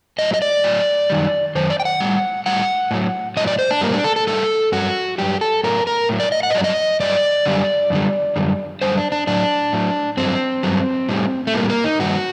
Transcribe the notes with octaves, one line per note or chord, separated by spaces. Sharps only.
A2 F#3 D#5
D#5
D5
A2 F#3
F#2 D#3 G3
F#2 D#3 C5
D5
G5
F#5
A2 G3
A2 G3 F#5
A2 F#3
A2 F#3 D#5
D5
C5
D4
A2 G3 A#3
D4
A4
A4
A2 G3 A4
G2 F#3 F#4
G2 F#3 G4
A4
A2 F#3 A#4
A#4
A2 F#3
D5
D#5
F#5
D#5
G2 F#3 D5
D#5
G2 F#3 D5
F#2 D3 G3
F#2 D3 G3
F#2 D3 G3
F#2 D3 G3 C5
D4
D4
A2 F#3 D4
A2 F#3
G2 F#3 C4
G2 F#3
A2 G3
A3
A2 G3 A#3
A#3
D#4
G2 D#3 G3 F#4